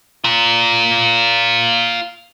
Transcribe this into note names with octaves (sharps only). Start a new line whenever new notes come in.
F4 A#4